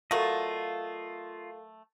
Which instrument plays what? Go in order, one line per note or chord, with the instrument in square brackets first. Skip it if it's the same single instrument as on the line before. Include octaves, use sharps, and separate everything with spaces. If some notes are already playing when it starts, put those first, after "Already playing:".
[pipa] F#3 A3 [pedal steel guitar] F4 D#5 [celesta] A4 A#4 F5